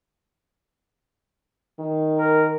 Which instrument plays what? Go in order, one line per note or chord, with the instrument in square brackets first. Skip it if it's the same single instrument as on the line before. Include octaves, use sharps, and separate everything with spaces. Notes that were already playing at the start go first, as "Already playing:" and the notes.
[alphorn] D#3
[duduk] A#4